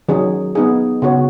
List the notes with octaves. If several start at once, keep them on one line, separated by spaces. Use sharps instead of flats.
D#3 F#3 C#4 G#4
B3 D#4 G#4
C#3 B3 F#4 C#5